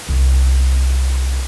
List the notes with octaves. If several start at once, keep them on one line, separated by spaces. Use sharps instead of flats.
C2